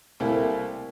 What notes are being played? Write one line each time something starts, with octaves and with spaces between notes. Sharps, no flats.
C2 A3 A#3 E4